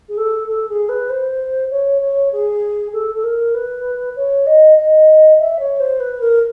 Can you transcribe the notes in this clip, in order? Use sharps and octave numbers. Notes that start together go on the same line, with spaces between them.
G#4
A4
A4
G#4
B4
C5
C#5
C#5
G#4
A4
A4
A#4
B4
C#5
D#5
D#5
E5
C#5
C5
B4
A#4